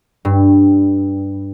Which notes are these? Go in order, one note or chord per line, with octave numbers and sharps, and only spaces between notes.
G2